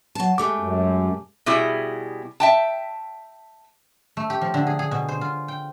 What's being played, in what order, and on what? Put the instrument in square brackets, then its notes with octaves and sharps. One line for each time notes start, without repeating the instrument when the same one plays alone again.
[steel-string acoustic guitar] F#3 A5
[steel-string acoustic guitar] G#3 A3 G4 [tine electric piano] D6
[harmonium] F#2
[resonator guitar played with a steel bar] B2 G3 E4 G#4
E5 G5 A5
[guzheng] A3
G4
F3
D3
G#4
G#4
B2
C5
F4
G5